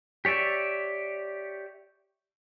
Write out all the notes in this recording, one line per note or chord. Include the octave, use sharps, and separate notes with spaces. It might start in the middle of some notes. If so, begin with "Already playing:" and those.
G4 C#5 D5 E5